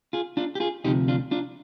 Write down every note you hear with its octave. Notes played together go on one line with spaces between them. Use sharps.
F4 G#4
D4 F4
G4
F4 G#4
D2 C3 F3 D#4 G4
D4 F4
D4 F4